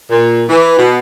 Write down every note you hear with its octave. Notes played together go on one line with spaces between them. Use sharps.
A#2
E3
B2